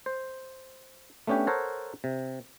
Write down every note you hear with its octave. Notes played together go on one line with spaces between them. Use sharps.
C5
A3 B3 C#4 D4 G4
A4 A#4 C5 C#5 F#5 A5
C3